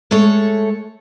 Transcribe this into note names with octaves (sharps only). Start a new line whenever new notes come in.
G#3 A3 A4 C#5